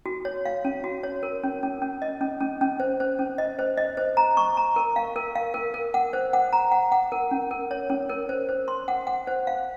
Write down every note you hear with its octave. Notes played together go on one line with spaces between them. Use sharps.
F#4
C#5
F5
C#4
F#4
C#5
A#4
C#4
C#4
C#4
D#5
C#4
C#4
C#4
C5
C5
C#4
D#5
C5
D#5
C5
A#5
C#6
A#5
A#4
F5
A#4
F5
A#4
A#4
F#5
C5
F#5
A#5
F#5
F#5
A#4
C#4
A#4
C#5
C#4
A#4
C5
C5
C6
F#5
F#5
C5
F5